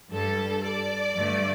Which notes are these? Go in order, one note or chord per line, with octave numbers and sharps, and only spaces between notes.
G2 G3 A4
D5
G2 D3 A3